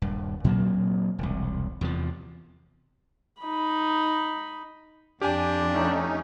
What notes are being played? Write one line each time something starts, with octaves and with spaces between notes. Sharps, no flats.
D#1 G2
A#2 F#3 A#3 C4
E1 C2
E2 C3 E3 F3
D#4 B5
F2 D4 G4 G#5
A3 C#4 D#4